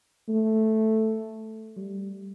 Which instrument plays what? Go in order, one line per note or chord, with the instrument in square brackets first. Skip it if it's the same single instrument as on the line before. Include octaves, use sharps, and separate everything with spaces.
[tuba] A3
G3